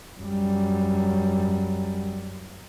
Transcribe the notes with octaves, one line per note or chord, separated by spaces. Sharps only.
F#2 G3